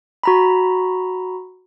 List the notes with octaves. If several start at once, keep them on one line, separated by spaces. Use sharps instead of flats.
F#4 A#5 B5